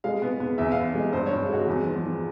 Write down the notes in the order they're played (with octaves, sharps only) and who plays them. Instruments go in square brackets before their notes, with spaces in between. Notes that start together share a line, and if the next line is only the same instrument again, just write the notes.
[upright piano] G#3 F5
B3
B3
E2 E5
B3 F5
G#3
G2 C5
G2 C#5
G#3 F#4
E2
F3
F3